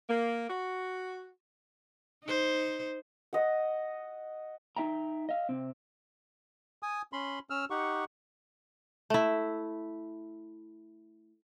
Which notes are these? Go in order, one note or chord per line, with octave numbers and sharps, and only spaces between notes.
A#3
F#4
D#4 C5
D#5 F#5
D#4 E5 G5 A#5
D#5 F5
C3 C4
G#5 D#6
C#4 B5 C6
C#4 E6 F6
D#4 G4 F#5 C#6
A3 E4